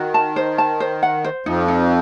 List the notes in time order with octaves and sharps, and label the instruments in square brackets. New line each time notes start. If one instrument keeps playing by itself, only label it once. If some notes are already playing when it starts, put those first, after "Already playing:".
Already playing: [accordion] D#3 [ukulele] F#4
[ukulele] A5
C5
A5
C5
F#5
C5
[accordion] F2 F3 [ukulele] D#4
[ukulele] D#4